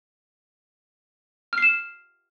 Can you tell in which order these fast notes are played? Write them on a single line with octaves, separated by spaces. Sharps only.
F6 C7 E7